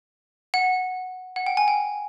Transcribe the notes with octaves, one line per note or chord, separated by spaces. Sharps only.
F#5
F#5
G5
G#5
G5